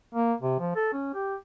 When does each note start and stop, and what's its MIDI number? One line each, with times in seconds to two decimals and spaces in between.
0.14 0.33 58
0.41 0.56 48
0.59 0.75 53
0.76 0.88 69
0.93 1.13 61
1.14 1.35 67